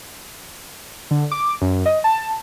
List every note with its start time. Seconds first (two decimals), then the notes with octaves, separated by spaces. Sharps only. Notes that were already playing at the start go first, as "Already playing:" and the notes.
1.11 D3
1.32 D6
1.62 F#2
1.86 D#5
2.04 A5